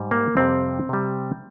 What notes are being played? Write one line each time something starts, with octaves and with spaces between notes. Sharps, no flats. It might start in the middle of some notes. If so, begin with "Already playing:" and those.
Already playing: G#2 G3
A#3
F2 C3 G3 C4
C3 G3